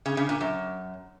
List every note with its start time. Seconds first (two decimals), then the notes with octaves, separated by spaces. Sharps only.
0.06 C#3
0.17 C#3
0.29 A#2
0.41 F#2